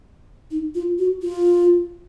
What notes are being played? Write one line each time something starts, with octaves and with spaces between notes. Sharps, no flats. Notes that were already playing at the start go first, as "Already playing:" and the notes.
D#4
F4
F#4
F4